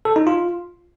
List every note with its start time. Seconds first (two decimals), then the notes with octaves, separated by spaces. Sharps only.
0.05 A4
0.16 D#4
0.27 F4